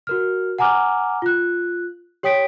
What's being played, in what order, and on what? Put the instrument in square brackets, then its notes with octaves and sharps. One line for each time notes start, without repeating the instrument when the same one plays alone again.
[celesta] F#4 A#4 F6
F#5 G#5 A#5 D6 F6
F4 F#6
G4 C#5 G5 D#6 B6 D7